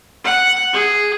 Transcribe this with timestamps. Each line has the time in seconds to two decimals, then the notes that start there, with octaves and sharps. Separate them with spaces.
0.24 F#5
0.73 G#4